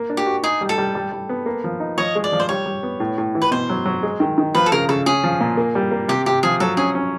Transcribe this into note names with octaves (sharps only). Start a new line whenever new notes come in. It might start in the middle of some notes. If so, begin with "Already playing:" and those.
Already playing: A#3
D4
G4
F#4
D#4 G#4
G3
A4
G3
G3
G3
B3
A#3
F3
D#4
F3 C#5 D#5
G#3
D5
F3
C5
G3 C#5
G3
B3
A2
A2
E3
B4
B2 C5
F#3
F#3
G#3
D#3
D#3
F3 B4
A4
C#3 A#4
C#3 A4
C#4 G#4
F3
A#2
A#3
G3
A#3
C3 G4
C3 G4
F3 G#4
F#3 A4
C#4 G#4
C#4